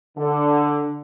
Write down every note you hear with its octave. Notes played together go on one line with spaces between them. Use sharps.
D3